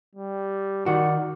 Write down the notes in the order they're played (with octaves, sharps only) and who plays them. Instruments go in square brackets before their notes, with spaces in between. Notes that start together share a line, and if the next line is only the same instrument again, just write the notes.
[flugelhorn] G3
[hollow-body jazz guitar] D#3 F#4 [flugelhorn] D5